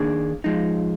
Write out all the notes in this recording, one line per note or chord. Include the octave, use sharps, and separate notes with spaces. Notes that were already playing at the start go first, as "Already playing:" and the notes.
Already playing: D#3 A#3 D4 G#4
F3 G#3 D#4